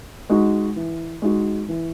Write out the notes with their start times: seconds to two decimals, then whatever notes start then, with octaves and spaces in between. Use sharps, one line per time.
0.30 G#3 D#4 F#4
0.76 E3
1.22 G#3 D#4 F#4
1.68 E3